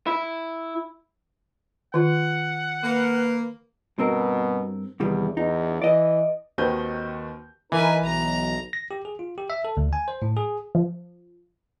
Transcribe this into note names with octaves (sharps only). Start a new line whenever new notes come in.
E4
D#3 F4 F#5
A#3 B4
G2 B2 C4 A#4
E2 C3 D#3 G3
E2 D#4
E3 D5 D#5
D#2 D#3 C4 F#4 B4 G6
E3 D#4 A#4 B4 G#5
B1 A#5
A#6
G4
G#4
F4
G4
E5
A4
D2
G#5
C5
A2
G#4
F3